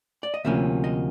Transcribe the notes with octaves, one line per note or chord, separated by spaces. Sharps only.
D5
D#5
D2 C3 F3 A#3 C#4 E5
D#5